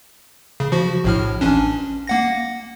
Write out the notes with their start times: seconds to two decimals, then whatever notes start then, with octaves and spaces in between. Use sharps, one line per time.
0.60 C#3
0.72 F3 F#4
1.04 A#1 A2 F6
1.41 A1 C#4 D4
2.07 A#3 F#5 A#6